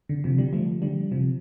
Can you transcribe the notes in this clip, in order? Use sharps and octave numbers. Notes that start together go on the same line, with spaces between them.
D3
C3 F3
D3 G3
F3 A3
D3 G3
C3 F3